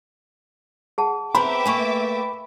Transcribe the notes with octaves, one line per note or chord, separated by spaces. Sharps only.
G#4 F#5 A5
B3 C4 A#4 E5 G5 B5 D6
A3 A#3 B4 G#5 C#6